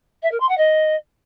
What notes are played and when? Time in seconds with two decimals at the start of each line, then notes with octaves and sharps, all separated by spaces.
0.23 E5
0.31 A#4
0.40 C6
0.49 F#5
0.58 D#5